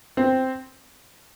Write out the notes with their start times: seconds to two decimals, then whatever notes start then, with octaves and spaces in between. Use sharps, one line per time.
0.17 C4